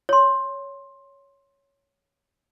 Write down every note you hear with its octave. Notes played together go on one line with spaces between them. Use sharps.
C#5 C6